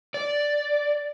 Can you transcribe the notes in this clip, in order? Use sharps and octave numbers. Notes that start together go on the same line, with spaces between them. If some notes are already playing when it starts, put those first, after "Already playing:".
D5